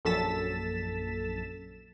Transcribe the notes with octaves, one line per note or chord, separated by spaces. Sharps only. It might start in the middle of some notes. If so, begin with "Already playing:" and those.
A#1 F#2 A4 A6 B6 E7